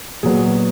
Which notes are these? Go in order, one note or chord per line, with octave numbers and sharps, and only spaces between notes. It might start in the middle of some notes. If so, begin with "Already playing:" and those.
A#2 F#3 B3 G#4